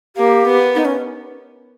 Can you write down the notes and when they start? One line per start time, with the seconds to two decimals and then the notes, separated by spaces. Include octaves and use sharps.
0.16 A#3 G4
0.46 B3
0.75 D#4
0.85 C#4